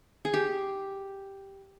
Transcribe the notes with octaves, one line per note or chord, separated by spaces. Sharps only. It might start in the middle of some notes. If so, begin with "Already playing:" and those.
G#4
G4